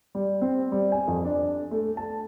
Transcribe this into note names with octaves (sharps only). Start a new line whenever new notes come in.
G3
C4
G3
G#5
F2
D4
A3
A5